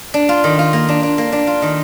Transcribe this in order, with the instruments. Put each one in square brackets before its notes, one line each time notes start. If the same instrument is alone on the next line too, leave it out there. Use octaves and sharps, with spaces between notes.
[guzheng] D4
F4
D#3
F4
A#3
D4
D4
A#3
D4
F4
D#3